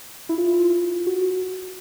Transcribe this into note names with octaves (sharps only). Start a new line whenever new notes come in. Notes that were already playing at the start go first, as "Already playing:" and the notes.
E4
F4
F#4